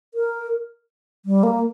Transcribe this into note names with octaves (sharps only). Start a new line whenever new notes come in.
A#4
G3
A#3